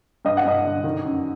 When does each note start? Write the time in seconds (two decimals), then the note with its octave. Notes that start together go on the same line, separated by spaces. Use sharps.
0.25 G2 D#5
0.37 F#5
0.45 G2 D#5
0.65 D3
0.84 D#3
1.05 F#2